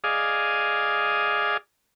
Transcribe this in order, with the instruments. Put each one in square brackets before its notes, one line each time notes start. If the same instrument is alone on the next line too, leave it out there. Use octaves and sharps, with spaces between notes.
[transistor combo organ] G#4 D5 D#5 F5